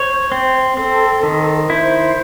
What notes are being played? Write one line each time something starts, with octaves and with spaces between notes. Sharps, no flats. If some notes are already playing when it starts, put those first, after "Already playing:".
Already playing: C5 C#5
C4
C4 A4
D#3
E4 C5